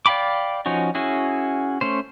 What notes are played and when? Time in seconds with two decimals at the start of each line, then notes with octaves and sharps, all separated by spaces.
0.06 D5 F5 G5 B5 D6
0.66 F3 C#4 D#4 F#4
0.95 C#4 E4 F#4 G#4
1.81 A3 C#4 C5